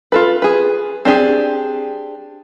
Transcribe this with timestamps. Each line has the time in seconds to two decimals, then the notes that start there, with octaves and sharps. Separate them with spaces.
0.12 F4 A4 B4
0.42 G#4 B4
1.05 C4 D4 G4 G#4